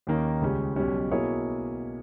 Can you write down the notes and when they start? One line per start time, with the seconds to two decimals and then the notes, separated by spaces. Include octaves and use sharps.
0.07 D#2 D#3 A#3 C#4
0.41 C#2 C#3 G3 C#4
0.76 B1 B2 G3 C#4
1.11 B2 A#3 E4 G#4 C#5